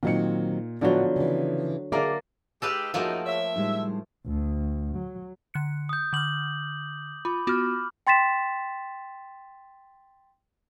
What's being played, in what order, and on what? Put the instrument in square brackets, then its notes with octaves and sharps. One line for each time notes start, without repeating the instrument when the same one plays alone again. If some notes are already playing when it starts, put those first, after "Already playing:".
[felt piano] A#2 D#4 C#7 [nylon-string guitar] D#3 F#3 C4
[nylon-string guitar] A2 D4 F#4 [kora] D3 F#3 [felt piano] F3 B3
[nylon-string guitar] C#3 E3
[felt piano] D3 E5 [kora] A#3 A#4 D5 [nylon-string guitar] G#4
[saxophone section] G#3 D#4 G4 [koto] A4 B4 F5
[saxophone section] F#2 D#4 [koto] F3 A3 A#3 [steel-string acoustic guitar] F4 F#4 G#4
[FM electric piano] C#5 [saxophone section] E5
[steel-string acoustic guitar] A2 G#3 C5 [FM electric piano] G3 D#4
[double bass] D2
F#3
[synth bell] D3 F#6 C#7
[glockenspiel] D#6 G6
[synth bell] D3 F6 [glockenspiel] D6 F#7
[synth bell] F4 [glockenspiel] B5 D6
[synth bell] B3 F4 F#4 [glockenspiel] D6 F6
[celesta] G5 C6 A6 B6 E7